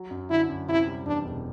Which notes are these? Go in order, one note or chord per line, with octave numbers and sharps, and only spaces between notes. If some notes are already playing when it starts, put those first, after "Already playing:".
Already playing: F#3
F#2
D3 E4
F#2
C3 E4
G3
E2 D4
E1